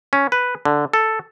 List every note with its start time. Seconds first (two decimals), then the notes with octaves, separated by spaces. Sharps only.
0.13 C#4
0.32 B4
0.65 D3
0.93 A4